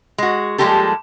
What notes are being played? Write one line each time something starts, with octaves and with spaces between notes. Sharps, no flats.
G#3 F#4
F3 G3 G#3 A#3 G4 A4